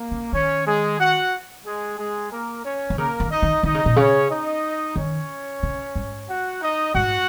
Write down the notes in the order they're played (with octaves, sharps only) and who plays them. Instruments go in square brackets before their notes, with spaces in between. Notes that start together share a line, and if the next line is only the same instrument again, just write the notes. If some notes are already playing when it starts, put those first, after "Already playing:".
Already playing: [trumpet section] A#3
[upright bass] C#3
[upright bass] D#3 [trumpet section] C#4 C#5
[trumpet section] G#3 G#4
F#4 F#5
G#3 G#4
G#3 G#4
A#3 A#4
C#4 C#5
[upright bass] D#3
[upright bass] C#3 [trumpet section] A#3 A#4
[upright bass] D#3
[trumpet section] D#4 D#5
[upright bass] D#3
[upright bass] D#3 [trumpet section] D#4 D#5
[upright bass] C#3
A#2
[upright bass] C#3 [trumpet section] C#4 C#5
[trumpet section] D#4 D#5
[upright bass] D#3 [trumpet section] C#4 C#5
[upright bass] C#3
G#2
[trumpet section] F#4 F#5
D#4 D#5
[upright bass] G#2 [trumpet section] F#4 F#5